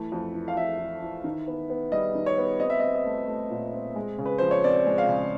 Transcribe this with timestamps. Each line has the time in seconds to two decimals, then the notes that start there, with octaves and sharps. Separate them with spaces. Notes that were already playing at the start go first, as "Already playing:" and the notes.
Already playing: E3 A3
0.12 F2
0.34 E3
0.48 F5
0.56 F2 E5
0.79 E3
1.02 E3
1.24 D#3
1.48 B3
1.70 B3
1.92 G3 D#5
2.15 D#3
2.26 C#5
2.38 B3
2.60 C4 D#5
2.70 E5
2.80 C4 D#5
2.94 D#5
3.05 A3
3.28 A3
3.50 A#2
3.74 C4
3.96 G#3
4.18 C#3
4.26 B4
4.38 F3 C5
4.51 C#5
4.64 C4 D5
4.87 G#3
4.98 F5
5.09 C#3